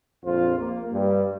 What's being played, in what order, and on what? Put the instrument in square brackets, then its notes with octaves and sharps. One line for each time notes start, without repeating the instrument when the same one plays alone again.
[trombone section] A#1 F2 F4 C5
A#3
G2 G3